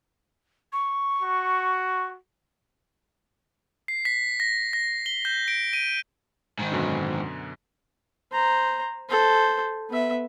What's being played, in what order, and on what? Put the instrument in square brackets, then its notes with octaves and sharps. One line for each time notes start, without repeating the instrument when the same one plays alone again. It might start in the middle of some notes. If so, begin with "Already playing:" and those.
[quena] C#6
[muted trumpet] F#4
[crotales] C7
B6
A#6
A#6
G7
G6
D7
D#7
[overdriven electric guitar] G#2 D#3
[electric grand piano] F#2 B2 D3
[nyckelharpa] C5 A#5
A4 C5
B3 E5